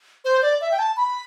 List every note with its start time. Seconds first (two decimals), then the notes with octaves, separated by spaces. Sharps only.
0.25 C5
0.42 D5
0.61 E5
0.72 G5
0.79 A5
0.97 B5